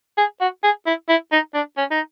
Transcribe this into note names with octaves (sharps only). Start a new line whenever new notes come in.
G#4
F#4
G#4
E4
E4
D#4
D4
C#4
D#4